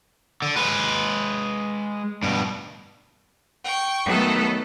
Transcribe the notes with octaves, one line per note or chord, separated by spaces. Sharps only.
D3
G#3 B4
G2 B2
G5 C#6
D#3 F#3 A3 B3 A4 B4